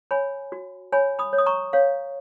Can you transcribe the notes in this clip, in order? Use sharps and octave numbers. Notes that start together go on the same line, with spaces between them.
C#5 G#5 B5
F#4
C#5 G#5 B5
B5 D#6
C#5
D#6
A#5 C#6
C#5 F5